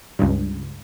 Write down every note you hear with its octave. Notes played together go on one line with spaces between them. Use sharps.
C#2 G2